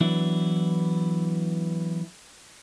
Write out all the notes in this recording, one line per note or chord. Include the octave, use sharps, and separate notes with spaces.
E3 F#3 B3 D4 E4